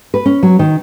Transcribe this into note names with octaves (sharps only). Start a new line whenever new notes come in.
B4
C#4
F#3
D#3